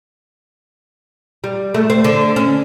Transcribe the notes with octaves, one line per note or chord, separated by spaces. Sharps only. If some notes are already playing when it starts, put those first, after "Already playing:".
G3
A3
C4
D3
C#4